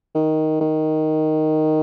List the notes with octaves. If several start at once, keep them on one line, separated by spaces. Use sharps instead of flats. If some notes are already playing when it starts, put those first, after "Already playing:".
D#3
D#3